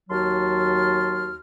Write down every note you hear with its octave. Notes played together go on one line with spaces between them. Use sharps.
D#2 F#3 F#4 A5 C6 F6